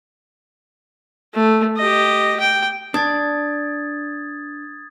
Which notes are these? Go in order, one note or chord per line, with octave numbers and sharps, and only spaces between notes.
A3
G4 D#5
G5
D4 D#6 G#6 A6